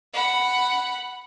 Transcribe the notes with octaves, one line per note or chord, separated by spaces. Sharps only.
F#5 B5